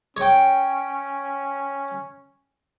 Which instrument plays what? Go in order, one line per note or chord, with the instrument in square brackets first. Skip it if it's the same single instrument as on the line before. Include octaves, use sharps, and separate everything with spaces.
[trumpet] C#4 [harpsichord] C#5 G5